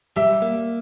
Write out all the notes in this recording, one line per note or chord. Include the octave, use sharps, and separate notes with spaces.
G3 E5
A#3